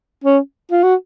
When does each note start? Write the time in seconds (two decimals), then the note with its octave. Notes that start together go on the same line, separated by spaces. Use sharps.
0.24 C#4
0.71 F4
0.83 F#4